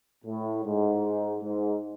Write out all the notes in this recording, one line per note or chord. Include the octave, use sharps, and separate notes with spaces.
A2
G#2
G#2